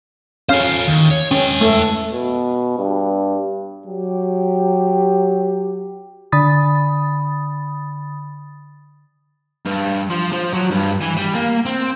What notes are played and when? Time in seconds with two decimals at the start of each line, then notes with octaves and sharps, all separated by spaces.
0.49 C#4 A4 C5 F5
0.87 D#2
1.10 C#5
1.31 C#4 B4 G5
1.61 A3
2.12 B2
2.78 G2
3.86 F#3 G4
6.32 D3 B5 D#6 A6
9.65 G2
10.10 F3
10.33 F3
10.53 F#3
10.71 G2
11.01 E3
11.17 G3
11.35 A#3
11.66 C4